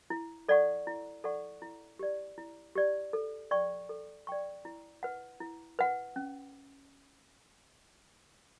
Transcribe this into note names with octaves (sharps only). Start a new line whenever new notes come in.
E4
A4 D5 F#5 C#6
E4
A4 D5 F#5 C#6
E4
G4 D5
E4
G4 D5
A4
D5 G5 C#6
A4
D5 G5 C#6
E4
B4 F#5
E4
B4 F#5
C#4